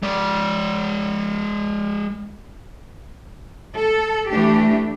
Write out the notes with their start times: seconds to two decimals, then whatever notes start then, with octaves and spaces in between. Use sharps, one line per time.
0.03 G#3 D5
3.76 A4
4.29 E3 A3 D4 G4